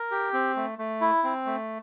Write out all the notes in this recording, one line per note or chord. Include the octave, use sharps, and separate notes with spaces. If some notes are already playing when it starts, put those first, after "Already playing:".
Already playing: A#4
G4
C4
A3
A3
E4
C4
A3